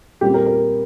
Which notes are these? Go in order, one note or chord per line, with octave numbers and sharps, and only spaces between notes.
A#2 G3 C4 G4
A#4
A#4